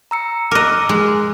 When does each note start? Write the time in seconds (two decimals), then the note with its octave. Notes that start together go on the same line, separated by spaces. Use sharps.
0.11 A#5 E6 C#7
0.51 A#4 D#5 D6 E6 F#6
0.89 G#3